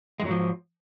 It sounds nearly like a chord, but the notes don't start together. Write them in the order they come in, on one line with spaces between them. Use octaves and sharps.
G#3 F2 F#3 G#2 F3